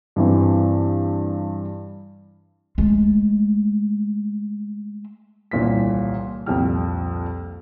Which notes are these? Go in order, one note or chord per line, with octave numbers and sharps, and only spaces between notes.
G2 E3 C4
G#3 A3
D#1 C2 A#2 E3 B6
C2 F2 A#2 G4 G5 F6